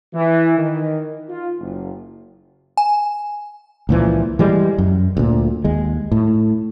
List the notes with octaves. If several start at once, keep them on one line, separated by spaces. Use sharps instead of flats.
E3
D#3
F4
F#1
G#5
C#2 A#2 E3 F3
E3 G3 G#3
F#2
D2 A#2
D#2 G#3
A2